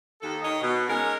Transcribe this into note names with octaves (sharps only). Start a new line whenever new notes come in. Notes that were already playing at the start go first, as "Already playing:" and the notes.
D#2 A4
D#3 C#5 D#5
B2
G#3 C#4 D#4 A#4